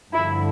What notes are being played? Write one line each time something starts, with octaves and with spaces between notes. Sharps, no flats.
G2 D3 F3 E4